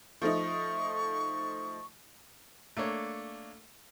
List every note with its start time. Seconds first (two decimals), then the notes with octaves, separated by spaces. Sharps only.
0.22 F3 A3 D#4 C#6
2.77 A3 A#3 D4 C#5